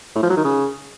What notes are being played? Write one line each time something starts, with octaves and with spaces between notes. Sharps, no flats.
A2
F3
F#3
D#3
C#3